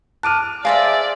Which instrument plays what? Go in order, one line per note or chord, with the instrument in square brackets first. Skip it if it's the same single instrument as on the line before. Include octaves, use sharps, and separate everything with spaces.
[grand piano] A5 D6 F6 [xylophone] F#6 D7 D#7
[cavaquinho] G#4 C5 E5 [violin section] D5 [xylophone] F5 G#5 A#6